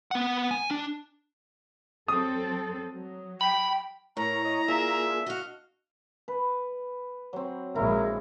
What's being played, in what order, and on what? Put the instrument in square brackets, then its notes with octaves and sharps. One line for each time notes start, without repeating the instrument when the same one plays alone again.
[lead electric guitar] B3 F#5
G#5
D4
[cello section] F#3 C4 A4 [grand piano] D#6
[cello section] F#3
[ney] G5 [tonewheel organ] B5
[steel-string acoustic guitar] A2 [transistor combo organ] A#4 C#5 [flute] A#5
[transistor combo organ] C#5 D#5
[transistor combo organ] A#3 F4 G#4 [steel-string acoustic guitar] D4 [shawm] E5
[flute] F#4 [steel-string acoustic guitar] D#5 F5
[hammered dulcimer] B4
F#3 C4
[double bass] A#1 G#3 [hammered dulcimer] E4 [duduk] A#4